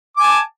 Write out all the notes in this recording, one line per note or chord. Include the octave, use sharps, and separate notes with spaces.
G#5 A5 D6